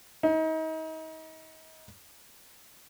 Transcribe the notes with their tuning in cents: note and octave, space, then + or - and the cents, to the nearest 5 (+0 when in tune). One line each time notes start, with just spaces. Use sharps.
D#4 +35